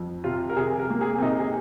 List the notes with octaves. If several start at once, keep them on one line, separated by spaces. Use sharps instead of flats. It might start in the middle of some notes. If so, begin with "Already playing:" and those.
Already playing: F2
C3 F4
A#4
C3 G#4
A#4
A#3
G#4
C4
C3 D#4
G#4